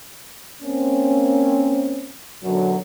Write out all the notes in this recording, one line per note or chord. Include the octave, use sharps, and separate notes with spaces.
A#3 C4 C#4
F#2 B2 D3 F#3